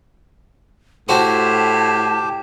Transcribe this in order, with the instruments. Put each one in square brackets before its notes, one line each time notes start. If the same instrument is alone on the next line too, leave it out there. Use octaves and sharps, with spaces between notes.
[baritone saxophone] A2 [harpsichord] F#4 C5 [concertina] G4 [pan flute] A5